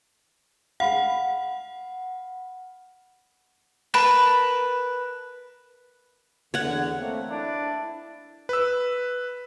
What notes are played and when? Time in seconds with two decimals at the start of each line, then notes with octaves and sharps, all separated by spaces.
0.80 F5 F#5 B5
3.94 A#4 B4 A5 B5
6.54 E2 D3 C#5 F#5
6.96 A3 A#3 C4
7.31 D4 E4
8.49 B4 E6